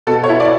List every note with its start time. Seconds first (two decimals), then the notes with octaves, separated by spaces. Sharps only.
0.07 B2 A4
0.23 C#5
0.29 E4
0.40 D5